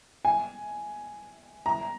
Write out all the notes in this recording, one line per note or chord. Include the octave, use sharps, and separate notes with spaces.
G#5
A#5